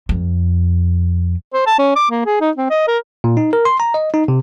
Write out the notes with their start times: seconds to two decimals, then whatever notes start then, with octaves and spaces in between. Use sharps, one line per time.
0.09 F2
1.54 C5
1.67 A5
1.79 C#4
1.96 D6
2.11 A#3
2.26 G#4
2.41 D#4
2.57 C4
2.70 D#5
2.88 A#4
3.24 A#2
3.37 D#4
3.53 A#4
3.65 C6
3.80 A#5
3.94 D#5
4.14 D#4
4.28 C3